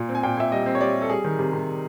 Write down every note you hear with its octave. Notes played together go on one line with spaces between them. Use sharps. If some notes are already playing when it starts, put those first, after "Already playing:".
Already playing: A#2
C4
G#5
A#2 G5
A#2 E5
G3 D#5
C4
C#5
G3 D5
G3
A4
G3 G#4
D#3
C3
C3